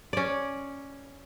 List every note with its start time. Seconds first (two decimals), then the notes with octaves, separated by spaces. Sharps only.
0.13 C#4 D5